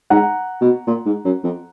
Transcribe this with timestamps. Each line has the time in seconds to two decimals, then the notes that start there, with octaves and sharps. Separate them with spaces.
0.10 G#2 F#5 A#5
0.61 B2
0.87 A#2
1.06 G#2
1.25 F#2
1.44 F2